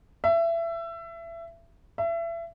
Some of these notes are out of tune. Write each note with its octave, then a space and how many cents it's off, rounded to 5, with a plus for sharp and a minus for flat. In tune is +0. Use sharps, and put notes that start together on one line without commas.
E5 +25
E5 +30